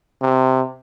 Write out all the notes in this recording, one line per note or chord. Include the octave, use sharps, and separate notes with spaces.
C3